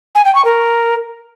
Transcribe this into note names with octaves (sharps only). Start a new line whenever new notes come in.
G#5
G5
C#6
A#4